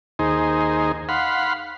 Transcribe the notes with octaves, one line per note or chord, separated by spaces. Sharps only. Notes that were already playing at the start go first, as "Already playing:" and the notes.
D#2 D#4 G#4 C5
F5 F#5 B5 C6